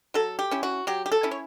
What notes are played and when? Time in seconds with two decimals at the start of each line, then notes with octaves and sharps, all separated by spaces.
0.14 F#3 A4
0.39 G4
0.51 C#4 E4
0.63 F#4
0.87 F#3 G4
1.06 G4
1.12 A4
1.23 C#4 E4
1.31 C#5